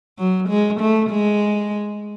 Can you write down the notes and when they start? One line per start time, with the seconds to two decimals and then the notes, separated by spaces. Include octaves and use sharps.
0.19 F#3
0.49 G#3
0.80 A3
1.10 G#3